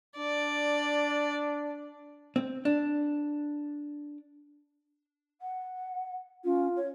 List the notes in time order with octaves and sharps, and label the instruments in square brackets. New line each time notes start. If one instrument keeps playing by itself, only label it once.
[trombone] D4 [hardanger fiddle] D5
[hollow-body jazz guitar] C4
D4
[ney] F#5
[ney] C#4 [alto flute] F4
[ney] C#5